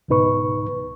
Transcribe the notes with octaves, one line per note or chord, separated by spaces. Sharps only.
C#2 G#2 B2 D#4 B4 C#6